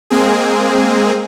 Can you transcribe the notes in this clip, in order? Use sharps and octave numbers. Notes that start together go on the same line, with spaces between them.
G#3 A#3 C4 G#4